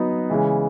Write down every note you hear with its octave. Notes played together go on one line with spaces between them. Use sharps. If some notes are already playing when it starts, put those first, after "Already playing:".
Already playing: F#3 B3 D#4
C#3 E3 G#3